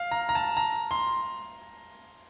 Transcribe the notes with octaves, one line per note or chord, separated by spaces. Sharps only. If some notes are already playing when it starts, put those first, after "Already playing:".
Already playing: F5
A#5
A#5
A5
A#5
C6